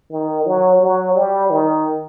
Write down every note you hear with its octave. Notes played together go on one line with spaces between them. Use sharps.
D#3
F#3
F#3
G3
D#3